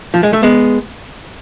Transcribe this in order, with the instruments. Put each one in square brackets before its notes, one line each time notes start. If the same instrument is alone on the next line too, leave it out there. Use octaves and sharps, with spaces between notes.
[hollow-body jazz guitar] F3
G#3
A3
G#3 B3